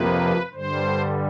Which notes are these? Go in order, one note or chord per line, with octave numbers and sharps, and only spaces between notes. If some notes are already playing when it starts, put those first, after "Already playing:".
Already playing: F2 C3 F3 A#3 B4
G2 D3 G3 C5